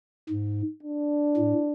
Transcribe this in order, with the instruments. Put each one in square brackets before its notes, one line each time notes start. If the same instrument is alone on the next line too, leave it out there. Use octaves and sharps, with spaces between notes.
[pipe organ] G#2
[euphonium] D4
[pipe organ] A2